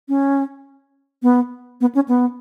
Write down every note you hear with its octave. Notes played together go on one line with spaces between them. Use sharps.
C#4
B3
B3
C#4
B3